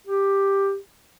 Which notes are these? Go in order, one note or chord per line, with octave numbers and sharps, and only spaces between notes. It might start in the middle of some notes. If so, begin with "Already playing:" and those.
G4